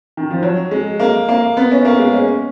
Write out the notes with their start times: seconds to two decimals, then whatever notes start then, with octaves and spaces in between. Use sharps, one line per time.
0.17 D#3
0.31 F3
0.43 F#3
0.71 G#3
1.00 A#3
1.29 A#3
1.57 B3
1.72 C#4
1.85 A#3
1.99 G#3
2.14 C#4